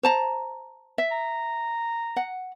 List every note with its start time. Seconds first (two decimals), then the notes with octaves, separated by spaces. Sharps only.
0.03 C5 A5 A#5
0.98 E5
1.11 A#5
2.16 F#5